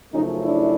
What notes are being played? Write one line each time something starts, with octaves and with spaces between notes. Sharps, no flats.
F#2 C#3 F3 A3 C#4 D#4
D4 E4